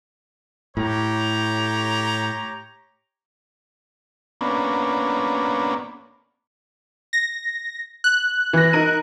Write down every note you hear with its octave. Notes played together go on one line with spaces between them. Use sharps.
A2 G4 C#5 A#5
A#3 B3 C#4 D4
A#6
F#6
E3 A#6
D#4 A#4 D#7